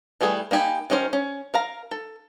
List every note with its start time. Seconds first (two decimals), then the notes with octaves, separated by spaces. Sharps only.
0.21 E3 G3 A3 G#4 B4
0.51 A#3 D#4 G4 G#5 B5
0.90 D#3 F#3 C#4 A#4 C5
1.13 C#4
1.54 A#4 F5 A#5
1.91 A4